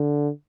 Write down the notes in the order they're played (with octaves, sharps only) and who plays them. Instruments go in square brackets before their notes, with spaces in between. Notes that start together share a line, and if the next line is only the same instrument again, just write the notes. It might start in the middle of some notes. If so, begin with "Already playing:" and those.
Already playing: [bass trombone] D3